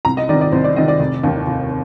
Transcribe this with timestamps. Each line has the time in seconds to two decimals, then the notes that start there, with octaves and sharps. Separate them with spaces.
0.05 C2 A#5
0.17 D#5
0.29 D#3 D5
0.32 C3
0.41 D5
0.52 C2 C5
0.64 D5
0.76 C3 D#3 D#5
0.88 D5
1.00 F1
1.23 D#2 D#3
1.47 F1